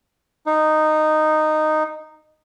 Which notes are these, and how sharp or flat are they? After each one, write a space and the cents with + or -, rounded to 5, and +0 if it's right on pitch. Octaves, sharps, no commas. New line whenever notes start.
D#4 -10